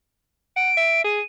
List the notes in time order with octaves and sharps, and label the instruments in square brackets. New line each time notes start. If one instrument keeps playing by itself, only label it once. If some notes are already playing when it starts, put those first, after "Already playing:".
[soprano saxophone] F#5 [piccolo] D7
[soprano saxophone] E5
[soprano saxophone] G#4 [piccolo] D#7